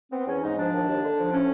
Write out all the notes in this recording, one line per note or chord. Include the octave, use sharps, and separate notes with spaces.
B3 C4
E2 C#4
G#2 D#4
F3 D4
D#2
D#2
D3
F3
A2 C#4